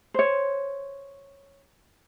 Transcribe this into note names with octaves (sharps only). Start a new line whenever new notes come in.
C5 C#5